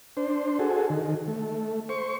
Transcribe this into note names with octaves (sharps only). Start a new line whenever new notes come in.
D4 C5
F#4 G#4 A4
D#3
A3
C5 C#6